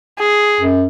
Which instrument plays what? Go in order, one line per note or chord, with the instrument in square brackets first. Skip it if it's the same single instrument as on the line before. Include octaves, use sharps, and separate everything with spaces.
[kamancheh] G#4
[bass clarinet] F#2